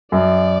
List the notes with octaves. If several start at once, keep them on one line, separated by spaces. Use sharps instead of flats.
F#2 D5